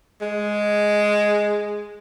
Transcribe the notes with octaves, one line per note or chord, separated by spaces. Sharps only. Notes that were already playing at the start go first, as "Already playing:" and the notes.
G#3